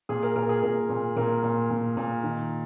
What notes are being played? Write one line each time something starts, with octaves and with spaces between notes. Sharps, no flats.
A#2 G#4
A#4
A#2 A#4
G#4
A#2 A#4
A#2
A#2 A#4
A#2
A#2
A#2
D#3